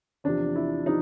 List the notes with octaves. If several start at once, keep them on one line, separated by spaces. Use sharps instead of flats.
E2 C3 F3 D4
E4
C3 F3 D#4